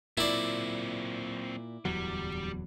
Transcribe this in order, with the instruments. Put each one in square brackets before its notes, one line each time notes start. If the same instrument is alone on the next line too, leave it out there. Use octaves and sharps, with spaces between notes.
[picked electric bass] A#2 [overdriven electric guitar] F#3 C4 [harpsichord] E4 D5
[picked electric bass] D1 E2 F#3 [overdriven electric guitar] G3